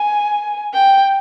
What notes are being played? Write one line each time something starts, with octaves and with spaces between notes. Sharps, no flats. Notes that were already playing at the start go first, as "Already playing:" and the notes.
Already playing: G#5
G5